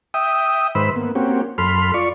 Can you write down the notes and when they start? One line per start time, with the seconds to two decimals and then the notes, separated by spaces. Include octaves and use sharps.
0.14 E5 G5 D#6
0.75 G#2 D#3 B4 C5 B5 E6
0.96 A#3 B3
1.15 A#3 C4 C#4 F#4 G4
1.58 F#2 A4 B5 C6 F6
1.94 F4 D5 C#6